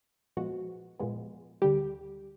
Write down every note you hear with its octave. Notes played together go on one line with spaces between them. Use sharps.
A#2 F3 G#3 B3 F#4
A#2 F3 G#3 B3
D2 D3 G3 G4